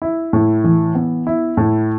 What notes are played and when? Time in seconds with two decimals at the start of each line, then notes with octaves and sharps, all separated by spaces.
0.02 E4
0.33 A2
0.64 E3
0.95 B3
1.27 E4
1.57 A2